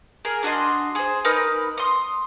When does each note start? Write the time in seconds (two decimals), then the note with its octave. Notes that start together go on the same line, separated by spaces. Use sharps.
0.25 G#4 A#4
0.43 D4 F#4 D#5 C6
0.95 G#4 C5
1.25 D#4 A#4 B4
1.78 C6 D#6